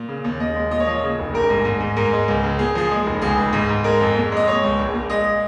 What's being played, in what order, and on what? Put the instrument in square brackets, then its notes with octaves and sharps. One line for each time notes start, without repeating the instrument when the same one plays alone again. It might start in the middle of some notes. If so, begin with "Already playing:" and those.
Already playing: [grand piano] A#2
C#3
D#2
D#2 D#5
G#3
A#2 D#5
C#5
F3 D#5
C#3
F1
A#1 A#4
G#2
G#2
G#2
G#2 A#4
G#3
C#2
C#3
A#2 G#4
F3 G#4
G#3
F1
C#2 G#4
C#2
G#2
G#2
G#3 A#4
F2
A#2
G#3 D#5
G#3 C#5
C#2
A#1
A#2
G#3 D#5